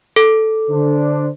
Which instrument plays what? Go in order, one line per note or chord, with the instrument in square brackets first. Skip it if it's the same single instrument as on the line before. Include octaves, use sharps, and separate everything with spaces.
[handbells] A4
[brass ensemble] D3 D4 C5